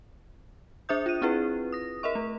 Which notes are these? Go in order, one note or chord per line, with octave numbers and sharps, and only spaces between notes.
D4 G#4 C5 E5 D#6 G6
F4 D#7
C4 E4 F4 G#4 B4
D#6 A#6
A#4 D#5 E5 C#6
A3